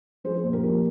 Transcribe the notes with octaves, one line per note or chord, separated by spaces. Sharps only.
F3 G#4 C5
A#2
G4 A#4
F3